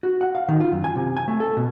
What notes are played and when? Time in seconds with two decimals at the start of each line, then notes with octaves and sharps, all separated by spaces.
0.03 F#4
0.21 F#5
0.35 F5
0.49 D#3
0.60 F4
0.72 F#2
0.84 G#5
0.95 C3
1.17 G#5
1.28 A3
1.40 A4
1.57 B2